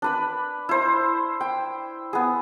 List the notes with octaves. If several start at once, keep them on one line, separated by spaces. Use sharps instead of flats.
D4 B4 B5
E4 C5
G5
B3 G#4